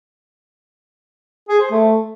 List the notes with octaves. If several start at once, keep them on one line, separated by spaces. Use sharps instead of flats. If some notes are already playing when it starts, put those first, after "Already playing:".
G#4
C5
A3